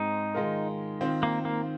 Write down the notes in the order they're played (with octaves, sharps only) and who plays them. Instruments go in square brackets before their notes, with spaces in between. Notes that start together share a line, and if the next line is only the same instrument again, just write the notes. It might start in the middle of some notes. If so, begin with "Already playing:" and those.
Already playing: [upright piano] G#2 G#3 C4 [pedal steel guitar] D#4
[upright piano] D#3 G#3 F4 A#4
D#3 C4 F4 C5
[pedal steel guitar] A#3
A#3